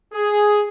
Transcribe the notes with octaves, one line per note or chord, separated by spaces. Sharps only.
G#4